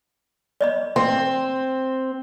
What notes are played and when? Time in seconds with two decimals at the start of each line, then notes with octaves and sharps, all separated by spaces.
0.61 D5 D#5 B5
0.96 C4 C6